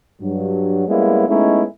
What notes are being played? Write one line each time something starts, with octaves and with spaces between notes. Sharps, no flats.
G2 F#3
G3 G#3 A#3 B3 C#4 E4
G#3 A3 B3 C#4 D#4 E4